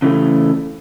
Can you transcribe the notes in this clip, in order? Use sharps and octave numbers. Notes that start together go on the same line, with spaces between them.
C#3 E3 A3